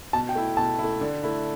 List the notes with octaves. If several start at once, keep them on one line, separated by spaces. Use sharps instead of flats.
B2 A5
G5
A3 E4
B2 A5
E4
A3
D3
A3 E4